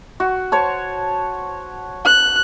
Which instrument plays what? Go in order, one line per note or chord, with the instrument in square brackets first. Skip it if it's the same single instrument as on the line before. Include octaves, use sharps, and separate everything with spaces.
[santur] F#4
C5 C#5 A5
[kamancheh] F#6